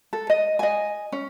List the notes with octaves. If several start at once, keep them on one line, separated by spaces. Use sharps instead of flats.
A4
D#5
D#5 G#5
C#4